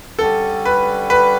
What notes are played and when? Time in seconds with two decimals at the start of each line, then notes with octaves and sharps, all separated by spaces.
0.19 D3 G3 C#4 A4
0.65 B4
1.10 B4